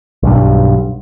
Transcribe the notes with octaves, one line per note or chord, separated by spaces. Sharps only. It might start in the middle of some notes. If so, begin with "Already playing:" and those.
B1 G2